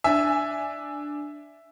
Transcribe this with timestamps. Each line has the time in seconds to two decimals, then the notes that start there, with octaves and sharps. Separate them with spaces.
0.04 D4 E5 G#5